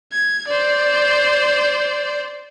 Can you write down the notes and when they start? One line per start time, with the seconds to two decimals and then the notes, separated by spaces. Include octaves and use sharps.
0.12 G#6
0.48 C5 D5